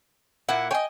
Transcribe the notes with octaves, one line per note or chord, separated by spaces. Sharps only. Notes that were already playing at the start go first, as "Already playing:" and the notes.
A#2 A#3 E4 F#5
C#5 D#5 G5 G#5